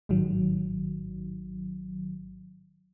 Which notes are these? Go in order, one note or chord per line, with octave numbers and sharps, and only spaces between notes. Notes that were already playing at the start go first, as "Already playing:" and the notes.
A1 G#2 D#3 F#3